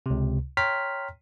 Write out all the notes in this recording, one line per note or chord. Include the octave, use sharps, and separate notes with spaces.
C#2 C3
C#5 G5 A#5 C6 F6 B6